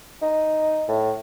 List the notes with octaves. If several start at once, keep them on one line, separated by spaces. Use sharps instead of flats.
D#4
A2